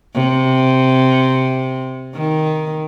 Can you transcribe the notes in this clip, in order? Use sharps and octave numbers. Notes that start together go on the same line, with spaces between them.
C3
D#3